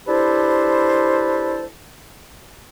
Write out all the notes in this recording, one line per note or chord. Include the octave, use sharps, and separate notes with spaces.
D4 E4 G4 A4 B4 C5